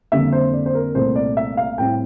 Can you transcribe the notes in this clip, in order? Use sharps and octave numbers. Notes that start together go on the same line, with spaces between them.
F2 D3 G3 A#3 E5
C5
D5
C5
A#4
C2 A#2 A3 C5
D5
E5
F5
A2 G3 C4 E4 G5